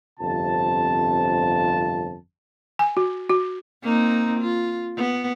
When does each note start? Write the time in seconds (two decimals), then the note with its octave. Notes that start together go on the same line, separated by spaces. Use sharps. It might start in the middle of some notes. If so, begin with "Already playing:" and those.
0.20 G1 F2 C3 F4 A5
2.79 G#5
2.97 F#4
3.29 F#4
3.83 A#3 C4 D#4
4.41 F4
4.96 B3